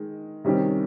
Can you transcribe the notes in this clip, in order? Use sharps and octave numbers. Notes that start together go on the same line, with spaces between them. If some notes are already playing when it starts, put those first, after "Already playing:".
Already playing: D#3 G#3
C3 D#3 G3 C#4 G4